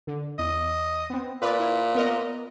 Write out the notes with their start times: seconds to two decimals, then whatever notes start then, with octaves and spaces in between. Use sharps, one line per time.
0.07 D3
0.39 E2 D#5
1.10 B3 C4
1.42 A#2 B4 D5
1.60 E4
1.95 B3 A#4 D#5